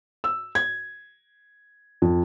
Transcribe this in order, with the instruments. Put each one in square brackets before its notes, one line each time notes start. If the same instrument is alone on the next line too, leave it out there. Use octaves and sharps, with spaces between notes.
[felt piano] E6
G#6
F2